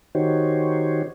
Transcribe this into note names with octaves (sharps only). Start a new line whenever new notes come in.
D#3 D#4 F#4 G4 C5 C#5